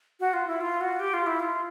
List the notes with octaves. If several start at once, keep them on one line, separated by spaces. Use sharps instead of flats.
F#4
F4
E4
F4
F#4
G4
F4
E4
F4